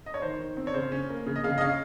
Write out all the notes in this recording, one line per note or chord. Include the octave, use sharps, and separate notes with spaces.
D#5
C#5
D#3 C5
D#3
C4
C#5
C#3 C5
C#4
A#3
C#3
D#5
C#3 F5
D#5
C#4 F5